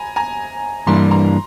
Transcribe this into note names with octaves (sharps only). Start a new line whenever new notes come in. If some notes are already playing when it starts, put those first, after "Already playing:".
Already playing: G#5 A#5 B5
G#5 A#5
G2 E3 G3 A#3 D4 A#5 C6
A#5 C6